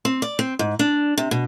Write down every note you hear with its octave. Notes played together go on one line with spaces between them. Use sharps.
C4
D5
C4
G#2
D4
C3
B2